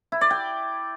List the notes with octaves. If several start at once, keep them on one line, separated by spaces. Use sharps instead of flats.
E4
D5
G5